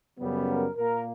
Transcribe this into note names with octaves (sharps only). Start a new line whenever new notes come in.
F#2 C#3 G3 B3
A#4
A#2 A#3 A#4